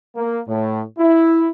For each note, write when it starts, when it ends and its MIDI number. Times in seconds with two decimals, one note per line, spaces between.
0.16 0.38 58
0.47 0.81 45
0.98 1.48 64